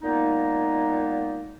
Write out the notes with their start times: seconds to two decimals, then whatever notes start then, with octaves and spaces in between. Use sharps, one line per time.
0.02 A#2 G#3 A#3 B3 D#4